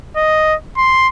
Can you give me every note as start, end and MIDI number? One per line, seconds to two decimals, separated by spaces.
0.17 0.55 75
0.77 1.08 84